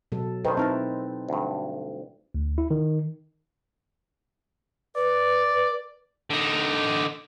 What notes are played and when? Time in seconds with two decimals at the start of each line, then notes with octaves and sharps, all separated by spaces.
0.12 B2 F#3 A4
0.45 G2 D#3 A4 B4 C5
0.57 A3 C4 D#4 E4 A#4 A5
1.29 D2 G2
2.35 D2
2.58 E4
2.71 D#3
4.96 B4 D5
6.30 D3 D#4